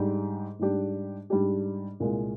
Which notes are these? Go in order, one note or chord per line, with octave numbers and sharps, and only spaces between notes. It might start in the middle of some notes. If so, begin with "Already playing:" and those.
Already playing: G#2 G3 D4 G4
G#2 G3 D4 G4
G#2 G3 D4 G4
C2 A#2 G#3